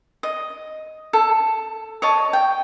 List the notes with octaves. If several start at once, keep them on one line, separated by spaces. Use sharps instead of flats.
D#5
A4
C#5 D#5 A5
G5